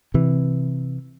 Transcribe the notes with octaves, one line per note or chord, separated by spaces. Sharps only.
C3 E3